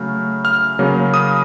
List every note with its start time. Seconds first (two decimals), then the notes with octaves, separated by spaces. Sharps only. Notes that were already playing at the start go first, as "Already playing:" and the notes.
Already playing: C#3 F#3 A3 F6
0.45 F6
0.79 C#3 F#3 A#3
1.14 D#6